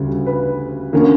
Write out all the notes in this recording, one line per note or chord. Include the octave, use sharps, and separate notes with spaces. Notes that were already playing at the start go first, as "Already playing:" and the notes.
Already playing: D2 C#3 G3
B4
D3 A#3 C#4